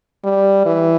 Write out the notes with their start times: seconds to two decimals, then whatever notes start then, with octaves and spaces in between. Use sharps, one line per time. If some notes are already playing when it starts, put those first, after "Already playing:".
0.24 G3
0.66 E3